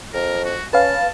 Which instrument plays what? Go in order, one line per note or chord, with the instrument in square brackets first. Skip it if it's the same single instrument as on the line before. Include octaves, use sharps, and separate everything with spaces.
[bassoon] F2 [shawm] A#4
[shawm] F#4
[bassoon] C#4 [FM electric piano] B4 F5 [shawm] A5